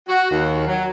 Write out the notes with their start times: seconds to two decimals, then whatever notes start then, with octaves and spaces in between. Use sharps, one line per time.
0.07 F#4
0.30 D#2
0.67 F#3